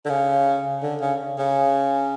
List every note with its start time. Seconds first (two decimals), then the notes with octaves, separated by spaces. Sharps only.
0.05 D3
0.10 C#3
0.82 D3
1.01 C#3
1.38 C#3